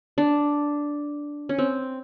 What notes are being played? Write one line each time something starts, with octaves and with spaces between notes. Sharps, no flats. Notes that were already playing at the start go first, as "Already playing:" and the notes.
D4
C#4
C4